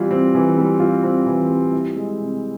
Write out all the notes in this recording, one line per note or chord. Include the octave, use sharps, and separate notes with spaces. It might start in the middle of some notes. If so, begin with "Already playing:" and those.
Already playing: E3 G3 C4 F4
C4
E3
G3
F4
C4
E3
G3
E4
G#3
C3